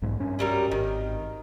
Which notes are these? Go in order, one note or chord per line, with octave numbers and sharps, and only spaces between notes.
B1 G#2
G2 C#4
F#3 G3 A#4
G#1 D#3